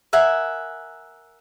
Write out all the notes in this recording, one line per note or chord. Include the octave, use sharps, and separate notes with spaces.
A#4 E5 F#5 G#5